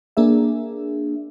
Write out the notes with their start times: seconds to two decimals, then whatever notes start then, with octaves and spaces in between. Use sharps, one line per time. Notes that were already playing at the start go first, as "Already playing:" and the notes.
0.17 A#3 D4 G#4 E5